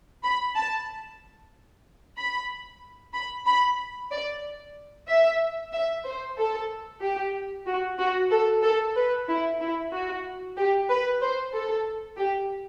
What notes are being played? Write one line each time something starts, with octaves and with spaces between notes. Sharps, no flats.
B5
A5
B5
B5
B5
D5
E5
E5
C5
A4
G4
F#4
F#4
A4
A4
B4
E4
E4
F#4
G4
B4
C5
A4
G4